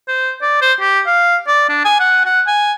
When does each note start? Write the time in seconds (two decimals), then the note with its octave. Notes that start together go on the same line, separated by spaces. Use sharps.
0.08 C5
0.42 D5
0.61 C5
0.80 G4
1.07 F5
1.47 D5
1.69 D4
1.85 G#5
2.00 F#5
2.25 F#5
2.47 G#5